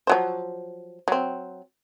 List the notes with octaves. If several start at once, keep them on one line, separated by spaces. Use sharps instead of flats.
F3 F#3 C5
F#3 C4